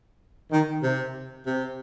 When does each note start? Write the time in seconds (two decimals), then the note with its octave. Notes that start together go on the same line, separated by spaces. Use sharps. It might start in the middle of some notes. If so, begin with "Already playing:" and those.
0.51 D#3
0.82 C3
1.45 C3